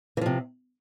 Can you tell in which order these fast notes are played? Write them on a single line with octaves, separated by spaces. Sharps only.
E3 F3 C3